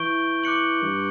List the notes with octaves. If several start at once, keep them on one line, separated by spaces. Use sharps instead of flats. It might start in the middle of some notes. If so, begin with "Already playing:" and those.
Already playing: E3 C#6 G6 D7 G7
D6 F#6 C#7 F#7
G2